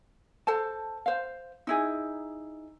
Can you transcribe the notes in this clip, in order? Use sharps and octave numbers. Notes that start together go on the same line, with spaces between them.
A4 C5 A5
C5 F5
D#4 E4 G#4